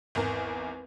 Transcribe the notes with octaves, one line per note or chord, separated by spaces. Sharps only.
G#1 E2 A#4